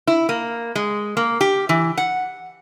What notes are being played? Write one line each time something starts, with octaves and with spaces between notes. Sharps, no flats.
E4
A#3
G#3
A#3
G4
E3
F#5